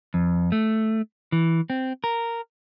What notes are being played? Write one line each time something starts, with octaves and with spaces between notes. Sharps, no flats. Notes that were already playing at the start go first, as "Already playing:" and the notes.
F2
A3
E3
C4
A#4